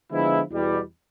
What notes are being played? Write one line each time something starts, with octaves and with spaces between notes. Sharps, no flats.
D3 F3 G#3 B3 E4
E2 B2 G3